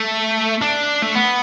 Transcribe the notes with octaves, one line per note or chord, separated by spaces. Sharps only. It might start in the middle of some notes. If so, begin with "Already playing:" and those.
Already playing: A3
D4
A3
B3